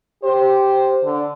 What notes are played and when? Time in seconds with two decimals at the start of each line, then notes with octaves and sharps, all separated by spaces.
0.24 G4 C5
1.04 D3